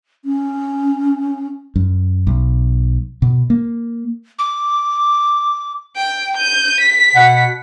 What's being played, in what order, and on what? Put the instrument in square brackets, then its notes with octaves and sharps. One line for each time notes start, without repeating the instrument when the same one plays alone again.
[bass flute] C#4
[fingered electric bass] F#2
B1
B2
A#3
[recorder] D6
[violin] G5
G6 D#7
B6
[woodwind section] B2 F#5